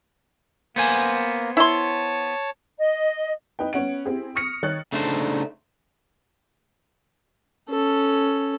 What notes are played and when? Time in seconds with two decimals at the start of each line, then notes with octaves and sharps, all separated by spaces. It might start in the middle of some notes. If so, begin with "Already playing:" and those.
0.76 A#3 B3 C5 G#5
1.57 E4 C#5 A5 C6
2.78 D#5
3.59 D#4 B4 G5
3.73 B3 C#4 F#5 D7
4.05 C4 E4 G4 G#4
4.35 C#6 D#6 F6 A#6 C#7
4.63 D#3 C#5 F#6 A6
4.93 C#3 A3 D4 D#4 C5
7.70 C#4 A4